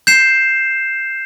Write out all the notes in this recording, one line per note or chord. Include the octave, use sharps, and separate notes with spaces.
G6 C7 E7